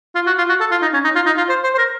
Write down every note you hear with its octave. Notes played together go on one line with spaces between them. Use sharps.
F4
F#4
F4
F#4
A4
F4
D#4
C#4
D#4
F4
D#4
F4
C5
C5
C5
A#4